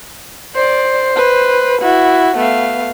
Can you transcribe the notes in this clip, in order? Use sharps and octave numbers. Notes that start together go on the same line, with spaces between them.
C5 D5
B4
E4 F#4
A3 B3 F5